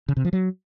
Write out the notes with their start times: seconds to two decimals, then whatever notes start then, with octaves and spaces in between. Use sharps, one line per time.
0.09 C#3
0.17 C3
0.25 F3
0.33 F#3